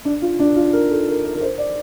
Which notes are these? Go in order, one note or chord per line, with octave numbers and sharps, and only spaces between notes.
D4
F4
D4
F4
A#4
A4
A#4
A#4
A#4
C5
D5